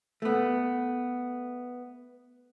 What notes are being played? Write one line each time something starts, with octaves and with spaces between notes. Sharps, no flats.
A3 B3